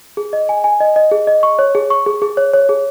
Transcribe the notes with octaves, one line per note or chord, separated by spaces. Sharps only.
G#4
D#5
G#5
G#5
D#5
D#5
G#4
D#5
C#6
C#5
G#4
C#6
G#4
G#4
C#5
C#5
G#4